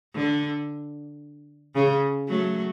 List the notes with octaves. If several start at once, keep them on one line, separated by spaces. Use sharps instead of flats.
D3
C#3
F#3 A3